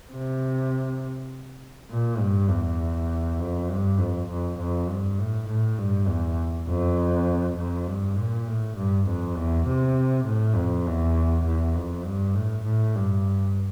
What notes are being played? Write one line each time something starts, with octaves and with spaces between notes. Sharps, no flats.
C3
A#2
G2
E2
F2
G2
F2
F2
F2
G2
A2
A2
G2
E2
F2
F2
G2
A#2
A2
G2
F2
E2
C3
A2
F2
E2
E2
F2
G2
A2
A2
G2